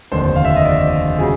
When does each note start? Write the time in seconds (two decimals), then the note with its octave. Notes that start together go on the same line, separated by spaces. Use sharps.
0.12 F1 D#2 D3 C5
0.36 F5
0.45 E5
0.56 D#5
0.65 D5
1.18 C#3 F#3 G#4